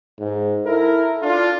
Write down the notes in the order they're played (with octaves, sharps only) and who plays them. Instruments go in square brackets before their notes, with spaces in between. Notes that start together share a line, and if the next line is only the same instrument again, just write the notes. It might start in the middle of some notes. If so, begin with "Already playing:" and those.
[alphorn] G#2
[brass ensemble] E4 A#4 [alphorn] A4
[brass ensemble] D4 F4